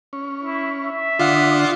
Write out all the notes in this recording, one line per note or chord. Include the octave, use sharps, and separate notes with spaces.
C#4
E4
E5
D3 D4 F4 F5 F#5 D#6